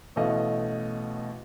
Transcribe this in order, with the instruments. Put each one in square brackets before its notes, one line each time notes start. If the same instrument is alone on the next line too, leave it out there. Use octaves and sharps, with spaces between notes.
[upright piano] A1 B2 A3 F#4 D#5 F5